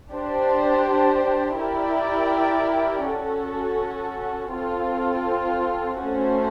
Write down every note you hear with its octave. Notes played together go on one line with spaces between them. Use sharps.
D4 G4 C5
E4 G4 A#4 D5 G5
C#4 F#4 A4
C4 F4 A4
A3 C#4 F#4 A4 C5